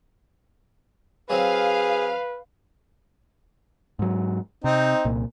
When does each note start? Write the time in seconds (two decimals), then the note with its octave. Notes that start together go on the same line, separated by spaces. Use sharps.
1.30 F#3 C4 G#4 B4 F5
3.99 G#2 F#3
4.64 C3 C4 D#4
5.05 C2 A#2